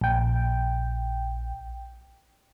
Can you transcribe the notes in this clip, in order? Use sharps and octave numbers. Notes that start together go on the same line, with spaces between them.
A#1 G5